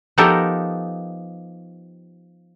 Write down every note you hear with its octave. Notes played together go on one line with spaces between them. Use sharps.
F3 B3 D#4 G4 A4 A#4